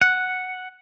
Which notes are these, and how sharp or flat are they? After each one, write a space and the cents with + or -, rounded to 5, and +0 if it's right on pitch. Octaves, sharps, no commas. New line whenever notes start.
F#5 +0